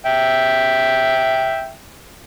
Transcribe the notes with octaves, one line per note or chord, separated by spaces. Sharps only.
E5 G5